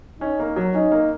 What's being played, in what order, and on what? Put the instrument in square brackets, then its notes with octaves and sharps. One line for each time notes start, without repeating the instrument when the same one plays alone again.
[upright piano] C#4 [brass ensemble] D#4
[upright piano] A#3
F#3
[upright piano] C#4 [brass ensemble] D#4
[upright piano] A#3